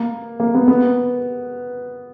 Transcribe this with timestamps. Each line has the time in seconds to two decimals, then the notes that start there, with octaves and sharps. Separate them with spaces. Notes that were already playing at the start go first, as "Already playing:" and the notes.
Already playing: A#3
0.40 A#3
0.55 B3
0.68 B3